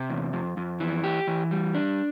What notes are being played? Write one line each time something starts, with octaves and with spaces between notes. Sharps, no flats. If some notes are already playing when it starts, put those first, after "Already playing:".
Already playing: C3
E2
F2
F2
E3
G4
E3
G3
D4